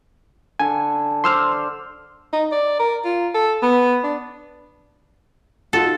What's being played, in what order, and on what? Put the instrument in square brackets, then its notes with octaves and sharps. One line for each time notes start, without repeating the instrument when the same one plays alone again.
[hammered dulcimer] D3 A4 [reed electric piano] G#5
[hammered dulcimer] C5 D5 D6 [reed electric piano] C6 E6 F6
[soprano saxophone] D#4
D5
A#4
F4
A4
B3
D4
[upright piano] D#4 F4 F#4 [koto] A4